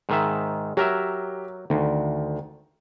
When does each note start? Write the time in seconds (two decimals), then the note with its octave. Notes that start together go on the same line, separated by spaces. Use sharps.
0.09 G#2 D#3 E5
0.77 F#3 G4 A#4 E5
1.70 D2 D#3